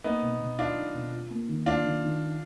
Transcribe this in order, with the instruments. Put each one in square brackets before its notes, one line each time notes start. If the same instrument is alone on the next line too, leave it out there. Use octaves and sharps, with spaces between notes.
[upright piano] A#3 [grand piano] B3 D#4
[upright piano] B2
B2
[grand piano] D4 F4 [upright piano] D#4
[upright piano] D#4
B2
F4
A#3
D#3
[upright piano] A#3 [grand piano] D4 F4
[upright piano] D#3
D#3
D4